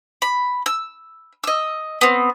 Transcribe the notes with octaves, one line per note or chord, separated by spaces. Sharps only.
B5
E6
D#5 E6
B3 C4